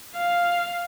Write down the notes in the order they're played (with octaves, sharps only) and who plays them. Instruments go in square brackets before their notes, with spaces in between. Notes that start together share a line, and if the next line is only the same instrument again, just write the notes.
[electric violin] F5